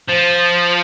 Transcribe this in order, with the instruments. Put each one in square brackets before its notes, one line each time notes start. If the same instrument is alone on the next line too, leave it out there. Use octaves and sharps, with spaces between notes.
[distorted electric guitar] F3